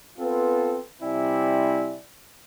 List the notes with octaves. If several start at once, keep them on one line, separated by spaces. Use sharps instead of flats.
B3 C4 F4 A4 B4
C3 G3 C4 E4 D5 G#5